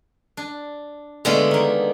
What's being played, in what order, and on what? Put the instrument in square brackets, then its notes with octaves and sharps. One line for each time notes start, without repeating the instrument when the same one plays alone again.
[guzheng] D4
[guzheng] D3 A3 F5 [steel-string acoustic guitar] G#3 B3 D5
[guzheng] D#3 A#3